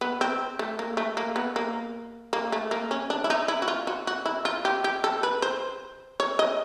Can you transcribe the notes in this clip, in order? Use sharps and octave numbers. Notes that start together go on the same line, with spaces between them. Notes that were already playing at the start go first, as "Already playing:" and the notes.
B3
C4
A3
A#3
A3
A#3
B3
A#3
A#3
A3
A#3
C#4
D4
E4
D#4
E4
F#4
F4
F#4
F#4
E4
F4
G4
G4
A4
B4
C5
C#5
D#5